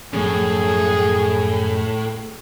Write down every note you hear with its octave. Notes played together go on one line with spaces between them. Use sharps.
F#2 A2 F3 C4 G#4